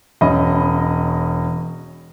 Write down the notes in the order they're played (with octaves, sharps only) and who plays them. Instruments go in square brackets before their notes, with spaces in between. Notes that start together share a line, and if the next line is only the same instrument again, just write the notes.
[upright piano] E1 C#4 D#5 B5